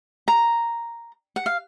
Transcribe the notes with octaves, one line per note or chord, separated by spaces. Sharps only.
A#5
F#5
F5